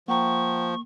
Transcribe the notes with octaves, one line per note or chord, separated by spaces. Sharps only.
F3 A#3 F#5 G5 A#5 C#6